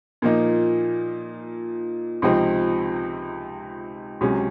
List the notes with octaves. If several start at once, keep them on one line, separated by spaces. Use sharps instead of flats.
A#2 F3 A#3 D#4
C#2 C3 F3 C4 D#4
C#2 C3 F#3 C#4